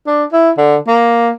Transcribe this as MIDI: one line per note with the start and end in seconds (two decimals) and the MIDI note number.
0.07 0.24 62
0.33 0.51 64
0.58 0.78 50
0.88 1.31 58